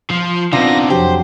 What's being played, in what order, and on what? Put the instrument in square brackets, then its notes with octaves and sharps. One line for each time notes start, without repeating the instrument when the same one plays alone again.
[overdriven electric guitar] F3 [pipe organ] C6
[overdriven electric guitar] C3 B3 [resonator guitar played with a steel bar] D4 D#4 F4 [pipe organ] A#6
[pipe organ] F2 F#3 [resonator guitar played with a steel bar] G4 [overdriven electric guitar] C5